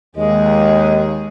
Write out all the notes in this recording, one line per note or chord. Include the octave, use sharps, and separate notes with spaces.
D#2 G#3 G#4 D#5